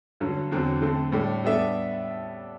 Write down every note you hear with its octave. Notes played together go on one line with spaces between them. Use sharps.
G2 D3 F#3
E2 D3 F#3 C4
D3 A3 C4
A2 G3 D4 A4
G3 B3 D4 A4 E5